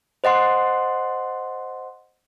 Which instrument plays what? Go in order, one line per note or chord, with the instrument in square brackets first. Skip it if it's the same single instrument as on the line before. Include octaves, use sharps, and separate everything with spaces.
[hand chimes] C5 D#5 F#5 C6